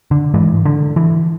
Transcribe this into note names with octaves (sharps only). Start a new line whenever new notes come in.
D3
G#2 E3
D3
E3